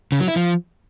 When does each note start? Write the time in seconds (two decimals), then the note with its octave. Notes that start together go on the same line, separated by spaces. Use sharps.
0.12 C#3
0.20 F#3
0.28 E4
0.36 F3